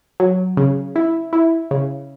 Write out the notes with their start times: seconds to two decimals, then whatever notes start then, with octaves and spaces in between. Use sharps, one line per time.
0.20 F#3
0.57 C#3
0.96 E4
1.33 E4
1.71 C#3